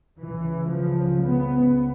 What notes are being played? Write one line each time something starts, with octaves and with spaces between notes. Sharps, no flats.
C#2 C#3 E3
F3
B3